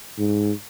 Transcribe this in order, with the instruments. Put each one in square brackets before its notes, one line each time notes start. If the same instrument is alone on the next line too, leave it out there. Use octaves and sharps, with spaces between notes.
[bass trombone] G#2